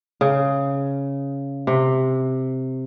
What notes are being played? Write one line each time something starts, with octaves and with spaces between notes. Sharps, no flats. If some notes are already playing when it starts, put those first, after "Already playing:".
C#3
C3